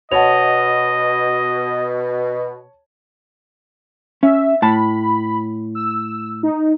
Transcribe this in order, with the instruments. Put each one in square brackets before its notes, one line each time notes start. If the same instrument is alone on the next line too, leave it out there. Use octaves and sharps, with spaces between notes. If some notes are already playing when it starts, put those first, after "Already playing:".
[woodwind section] B2 [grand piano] C#5 A5 [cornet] D#5 [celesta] F#5 F7
[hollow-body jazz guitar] C#4 [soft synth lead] E5
[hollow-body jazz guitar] A2 A5 [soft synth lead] B5
[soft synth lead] E6
D#4